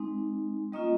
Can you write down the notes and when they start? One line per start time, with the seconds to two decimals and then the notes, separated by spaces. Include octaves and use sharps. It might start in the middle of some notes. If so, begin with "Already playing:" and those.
Already playing: G#3 C4 D#4
0.72 G3 A#3 C#4 F4 D#5 D#6